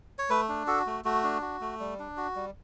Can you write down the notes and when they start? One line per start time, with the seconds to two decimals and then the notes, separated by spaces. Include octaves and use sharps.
0.19 C#5
0.30 A3 B4
0.49 D4
0.67 F#4 A4
0.86 A3
1.05 A3 F#4
1.24 D4
1.42 F#4
1.61 A3
1.80 G3
1.99 D4
2.17 F#4
2.36 G3